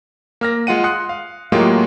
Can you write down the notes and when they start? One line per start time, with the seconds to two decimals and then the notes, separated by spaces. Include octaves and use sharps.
0.41 A#3 F6 A#6
0.67 G#3 F4 F#5 D#7
0.84 C6 D#6 F#6 C#7
1.09 F5
1.52 A2 F#3 G#3 A#3 F4 G4